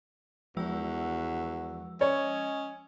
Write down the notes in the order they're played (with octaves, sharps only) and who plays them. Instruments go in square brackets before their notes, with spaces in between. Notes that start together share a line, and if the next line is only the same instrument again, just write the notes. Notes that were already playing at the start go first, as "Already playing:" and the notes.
[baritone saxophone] E2 [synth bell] F3 G#3 E6 [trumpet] F#4
[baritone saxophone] C#4 [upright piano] C#5 [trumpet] D#5